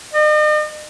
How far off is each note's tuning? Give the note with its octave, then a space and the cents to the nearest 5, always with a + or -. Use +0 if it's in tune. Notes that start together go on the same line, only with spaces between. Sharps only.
D#5 -45